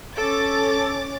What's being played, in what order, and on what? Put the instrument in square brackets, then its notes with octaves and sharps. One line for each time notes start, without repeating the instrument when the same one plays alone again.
[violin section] C#4 D6 A6 [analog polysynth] A4